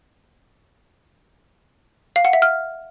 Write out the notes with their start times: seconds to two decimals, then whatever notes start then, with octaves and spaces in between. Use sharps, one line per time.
2.16 F5
2.25 F#5
2.33 E5
2.42 F6